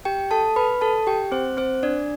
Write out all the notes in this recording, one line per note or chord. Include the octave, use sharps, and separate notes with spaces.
G4 G5
A4 A5
B4 B5
A4 A5
G4 G5
C4 C5
C4 C5
D4 D5